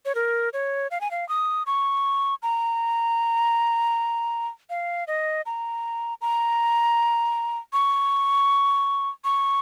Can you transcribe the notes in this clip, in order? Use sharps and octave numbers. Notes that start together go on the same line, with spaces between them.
C#5
A#4
C#5
F5
G#5
F5
D#6
C#6
A#5
F5
D#5
A#5
A#5
C#6
C#6